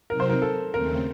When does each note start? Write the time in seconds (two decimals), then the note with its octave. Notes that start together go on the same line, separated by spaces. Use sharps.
0.10 C3 F#3 C4 D#4 A#4
0.20 C5
0.29 A#4
0.42 A4
0.73 D#2 C#3 A3 C4 A#4